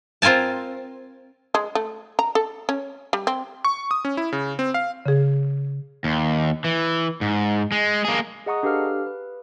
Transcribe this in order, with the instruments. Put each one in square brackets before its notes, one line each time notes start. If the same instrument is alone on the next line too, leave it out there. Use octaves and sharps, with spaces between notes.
[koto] C4 F4 A#4 G#5 A5
[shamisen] G#3
A3
A#5
A4
C#4
G3
C4
[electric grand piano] C#6
D#6
C#4
E4
C#3
C4
F5
[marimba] C#3 G#4
[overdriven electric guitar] D#2
E3
G#2
G#3
A#3 G#4
[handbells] G#4 D#5 F#5 A#5 C#6 D#6
D4 G4 A4 B4 F5 F6
B4